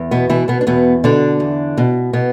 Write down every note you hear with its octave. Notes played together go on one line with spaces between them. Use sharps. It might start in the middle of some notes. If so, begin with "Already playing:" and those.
Already playing: E2
B2 B3
B2 E3 E4
B2 B3
D4
E2 B2 B3
B2 D3 D4
E2
B2
B2 B3